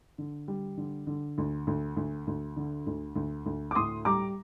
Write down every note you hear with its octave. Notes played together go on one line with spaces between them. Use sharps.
D3
G3
D3
D3
D2
D2
D2
D2
D3
D2
D2
D2
D6
A2 C6 D#6
G3 A#5 D6